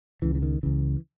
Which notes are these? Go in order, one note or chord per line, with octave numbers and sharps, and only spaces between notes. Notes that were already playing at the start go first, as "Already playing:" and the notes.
C#2 C#3 E3
E3
D#3
C#2 C#3 E3